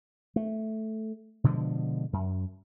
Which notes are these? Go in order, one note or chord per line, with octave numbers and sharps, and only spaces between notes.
A3
B2 D3 F3 G#3
F#2